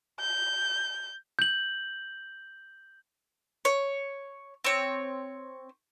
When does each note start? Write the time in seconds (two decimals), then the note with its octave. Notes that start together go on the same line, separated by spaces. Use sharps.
0.20 G6
1.39 G6 F#7
3.65 C#5
4.65 C4 C#5